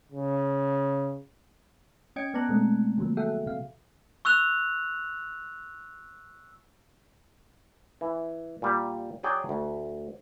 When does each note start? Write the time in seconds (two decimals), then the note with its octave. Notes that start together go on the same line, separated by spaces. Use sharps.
0.12 C#3
2.16 C#4 D#5 G5 G#6 C#7 D7
2.34 B3 D5 A5 A#5 F#6
2.49 B2 G#3 A3 C4
2.98 D3 F3 F#3 A#3
3.17 F#4 G#4 A4 E5 F#5 G5
3.46 C3 F5
4.25 C#6 E6 F#6 F7
8.01 E3
8.62 A#2 G3
9.23 F#3 G#4 D5 G5
9.49 D2